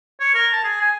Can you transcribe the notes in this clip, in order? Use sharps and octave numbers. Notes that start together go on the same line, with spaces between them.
C#5
A#4
A5
G#4
G#5